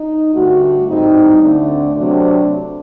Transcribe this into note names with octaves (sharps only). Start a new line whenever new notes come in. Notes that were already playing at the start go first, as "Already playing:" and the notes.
Already playing: D#4
G2 D3 A3 F#4
A2 G3 C4 D#4
D2 D3 A3 C4 D4
C3 F#3 A3 C4 D4